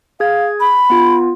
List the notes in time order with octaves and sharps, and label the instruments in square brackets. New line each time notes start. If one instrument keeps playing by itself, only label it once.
[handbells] G#4 G#6 [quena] F5
[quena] B5
[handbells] B3 F4